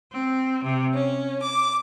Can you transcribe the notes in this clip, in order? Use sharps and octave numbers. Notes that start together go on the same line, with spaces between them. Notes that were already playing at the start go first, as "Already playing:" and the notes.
C4
C3
C#4
D6